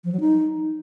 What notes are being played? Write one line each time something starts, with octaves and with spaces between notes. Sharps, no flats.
F3
F#3
D#4